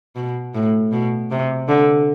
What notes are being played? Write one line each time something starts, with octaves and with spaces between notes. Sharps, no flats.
B2
A2
B2
C3
D3